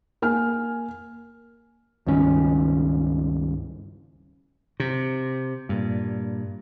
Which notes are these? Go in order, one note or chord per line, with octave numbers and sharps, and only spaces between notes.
A#3 G#5 F6
C#2 G2 D#3 C#4
C3
G2 A#2